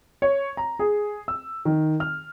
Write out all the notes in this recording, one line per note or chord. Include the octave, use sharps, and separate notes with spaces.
C#5
A#5
G#4
E6
D#3
F6